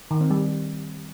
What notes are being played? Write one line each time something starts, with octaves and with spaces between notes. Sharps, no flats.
D#3
C4
G3